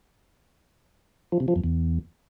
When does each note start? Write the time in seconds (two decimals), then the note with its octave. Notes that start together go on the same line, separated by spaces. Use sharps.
1.32 F3
1.40 C3
1.48 F3
1.56 F2
1.64 E2